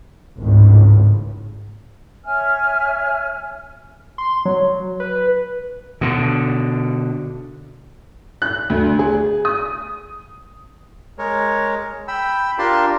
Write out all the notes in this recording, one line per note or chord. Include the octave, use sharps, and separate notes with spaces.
G#1 C#2 A2
C#5 E5 G#5 F6
C6
F#3
B4
B2 D3
F#6
D2
G#4
D#6
G#3 A#4 C#5
G5 B5 E6
D4 F4 G4 A#4 A5 C6